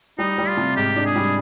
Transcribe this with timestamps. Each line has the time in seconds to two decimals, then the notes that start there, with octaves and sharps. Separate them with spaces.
0.18 G3 D#4
0.38 G3
0.48 F4
0.57 C3
0.76 G#2 G4
0.96 D4
1.06 G#4
1.15 G3